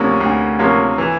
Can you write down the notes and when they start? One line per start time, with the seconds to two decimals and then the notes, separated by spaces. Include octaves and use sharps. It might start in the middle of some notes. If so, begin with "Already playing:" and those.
Already playing: D2 C3 F3 A#3 C#4
0.21 D2
0.59 C3 F3 A#3 C#4
0.98 E3